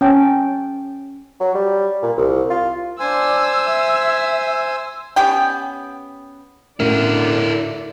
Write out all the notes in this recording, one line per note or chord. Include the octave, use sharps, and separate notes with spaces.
C#4 G5 A5
F#3
G3
A#2
C2
F4
D4 C5 G#5 E6
E5
B3 C#4 G4 G5
A2 D3 A3 C#4 E4 F#4 A#4 D5